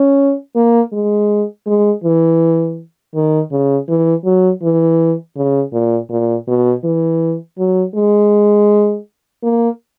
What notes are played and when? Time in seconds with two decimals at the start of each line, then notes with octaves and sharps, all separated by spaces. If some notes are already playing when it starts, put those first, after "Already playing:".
Already playing: C#4
0.55 A#3
0.93 G#3
1.66 G#3
2.04 E3
3.14 D#3
3.52 C#3
3.89 E3
4.25 F#3
4.63 E3
5.37 C#3
5.72 A#2
6.10 A#2
6.48 B2
6.84 E3
7.58 F#3
7.95 G#3
9.43 A#3